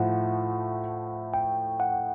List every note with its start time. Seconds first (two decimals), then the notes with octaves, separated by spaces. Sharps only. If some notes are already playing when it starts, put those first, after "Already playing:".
Already playing: A2 F3 A3 F#5
1.34 G5
1.80 F#5